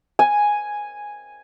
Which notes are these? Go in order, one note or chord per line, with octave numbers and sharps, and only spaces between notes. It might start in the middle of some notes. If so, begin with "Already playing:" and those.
G#5